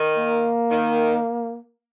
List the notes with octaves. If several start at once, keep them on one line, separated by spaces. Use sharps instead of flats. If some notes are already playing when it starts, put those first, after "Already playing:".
Already playing: D#3
A#3
D#3